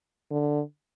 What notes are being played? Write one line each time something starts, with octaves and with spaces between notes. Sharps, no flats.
D3